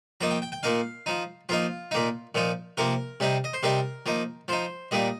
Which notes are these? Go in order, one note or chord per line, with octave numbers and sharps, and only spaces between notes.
F3 A#3 D#4 A#5
G5
G5
G5
A#2 A#3 D#4 F5
F3 D#4
F3 A#3 D#4 F4
A#2 A#3 D#4
A#2 F3 D#4
C3 F3 A#3 A#4
C3 G3 C4 D#4
D#5
C5
C3 G3 C4 D#4 A#4
F3 A#3 D#4
F3 D#4 C5
A#2 G3 A#3 D#4 D#5